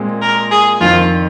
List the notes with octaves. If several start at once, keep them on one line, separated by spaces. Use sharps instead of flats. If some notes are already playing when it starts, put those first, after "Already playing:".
Already playing: A#2 G#3 C4 G#4
A#4
G#4
F2 D#3 C4 F4